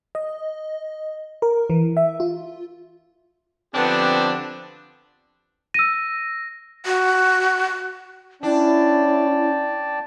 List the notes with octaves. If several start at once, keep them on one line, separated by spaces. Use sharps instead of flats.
D#5
A#4
E3
E5
F4
D3 F3 B3 C4 D4 G4
E6 A#6 D#7
F#4
C#4 D4 E4 D5 G5 A5